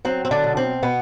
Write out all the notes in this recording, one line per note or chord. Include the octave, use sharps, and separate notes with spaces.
F#3 C4
C4
D3 D4
B2
C4
B2 B3